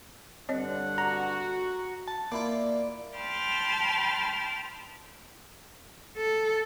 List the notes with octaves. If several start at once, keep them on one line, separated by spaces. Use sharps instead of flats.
G2 D3 C4 C#5 D#5 F#5
F#4 A#5
A5
A#3 E4 F4 D5
G5 A5 B5 C6 F6 A6
A4